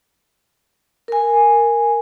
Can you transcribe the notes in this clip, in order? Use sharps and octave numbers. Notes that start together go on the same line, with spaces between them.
A#4 G#5